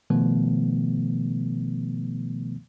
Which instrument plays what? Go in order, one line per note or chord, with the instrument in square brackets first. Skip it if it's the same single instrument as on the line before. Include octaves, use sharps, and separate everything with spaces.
[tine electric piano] B2 D#3 F3 A3 B3